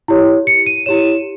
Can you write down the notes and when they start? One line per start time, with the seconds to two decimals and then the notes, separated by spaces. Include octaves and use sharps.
0.08 E4 G4 C#5
0.47 C#7
0.66 D#7
0.86 E4 G4 C#5 E7